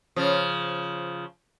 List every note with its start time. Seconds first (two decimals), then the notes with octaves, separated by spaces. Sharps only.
0.16 C#3 F3